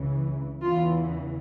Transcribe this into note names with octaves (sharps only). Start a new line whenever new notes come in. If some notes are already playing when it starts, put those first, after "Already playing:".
Already playing: C#2 C#3 E3
E2 C#3 E3 F4